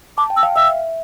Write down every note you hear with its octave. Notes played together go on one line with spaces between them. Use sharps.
A5 D6
G5
E6
F5
E5 E6